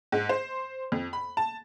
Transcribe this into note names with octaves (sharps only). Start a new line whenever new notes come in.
G#2
C5
F2
B5
A5